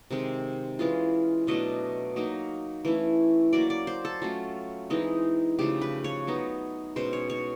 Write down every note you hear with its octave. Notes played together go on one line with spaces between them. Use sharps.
C3 D#3 G#3 C4
E3 G#3 C#4 F4
B2 F#3 A3 D4 D#5
F#3 A#3 D#4
E3 A3 C#4 E4
F#3 A#3 C#4 D5
D5
C5
A4
F#3 A3 C#4 F4
E3 G#3 C4 D#4
C#3 F3 A3 G4
B4
C#5
F#3 B3 D#4
B2 G#3 C#4 C5
C#5
C#5